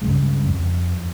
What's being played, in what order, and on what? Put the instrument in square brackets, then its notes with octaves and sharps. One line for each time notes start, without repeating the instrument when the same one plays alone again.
[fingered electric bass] C#2 G2 C#3 G#3
F2